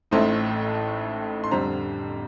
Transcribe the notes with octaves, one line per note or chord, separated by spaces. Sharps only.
A1 A2 A3 C4 D#4 C6
C6
F2 D3 G3 C4 A#5